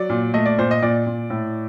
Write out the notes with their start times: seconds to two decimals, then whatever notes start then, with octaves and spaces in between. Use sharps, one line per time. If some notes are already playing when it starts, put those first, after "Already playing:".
Already playing: F#3 D5
0.10 A#2
0.34 A3 D#5
0.46 D5
0.58 A#2 C5
0.71 D#5
0.82 A#2 D5
1.07 A#2
1.30 A2